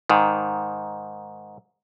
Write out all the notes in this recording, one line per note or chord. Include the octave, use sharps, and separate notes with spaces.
G#2 D#3